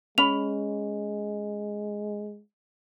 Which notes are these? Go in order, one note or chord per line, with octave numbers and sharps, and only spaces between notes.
G#3 C#4 B5 F7